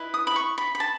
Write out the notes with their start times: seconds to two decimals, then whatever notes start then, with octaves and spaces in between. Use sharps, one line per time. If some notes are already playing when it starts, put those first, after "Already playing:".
Already playing: E4 B4 D#5
0.14 D#6
0.27 B5
0.36 C#6
0.58 B5
0.75 B5
0.80 A5